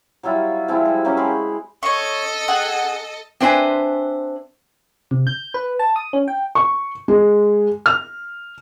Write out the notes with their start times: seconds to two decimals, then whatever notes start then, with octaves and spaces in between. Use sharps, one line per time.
0.23 F#3 G3 E4 F4
0.68 F3 G#3 C4 E4
0.85 G3
1.05 F#3 A#3 C#4 G4
1.17 G#3 B5 C6
1.83 A4 C#5 D#5 C#6
2.48 G#4 F#5
3.40 C4 D4 B4 C5 E5 G#5
5.11 C3
5.27 G6
5.54 B4
5.79 A5
5.96 D#6
6.13 C#4
6.28 G5
6.55 C#6
7.08 G#3
7.86 F6